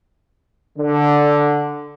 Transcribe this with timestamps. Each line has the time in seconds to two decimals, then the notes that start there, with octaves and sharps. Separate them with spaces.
0.78 D3